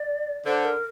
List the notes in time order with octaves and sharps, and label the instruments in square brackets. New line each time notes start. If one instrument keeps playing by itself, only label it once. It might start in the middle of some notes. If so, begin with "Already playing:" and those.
Already playing: [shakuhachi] D5
[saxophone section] D3 [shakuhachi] C5
[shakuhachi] A#4